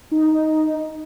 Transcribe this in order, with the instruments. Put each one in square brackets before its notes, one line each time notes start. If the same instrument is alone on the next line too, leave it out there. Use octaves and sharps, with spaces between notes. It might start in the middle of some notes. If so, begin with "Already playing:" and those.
[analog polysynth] D#4